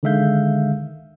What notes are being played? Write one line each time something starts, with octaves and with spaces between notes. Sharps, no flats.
D3 D#3 G#3 E5 F5 G6